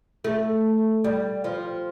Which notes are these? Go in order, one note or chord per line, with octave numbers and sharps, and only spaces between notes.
A3
G3
F3